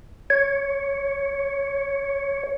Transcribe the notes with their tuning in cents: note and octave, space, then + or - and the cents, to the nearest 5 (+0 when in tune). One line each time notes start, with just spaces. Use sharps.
C#5 +5